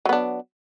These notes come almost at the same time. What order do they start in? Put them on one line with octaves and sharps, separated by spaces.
F#3 B3 D4